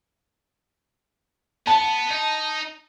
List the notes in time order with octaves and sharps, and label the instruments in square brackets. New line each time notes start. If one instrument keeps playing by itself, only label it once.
[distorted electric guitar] B3 [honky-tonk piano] A5
[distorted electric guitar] D#4 D#5